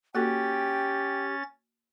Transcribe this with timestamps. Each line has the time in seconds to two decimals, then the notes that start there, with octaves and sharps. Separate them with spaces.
0.15 A#3 C#4 F#4 G4 A4 G5 A6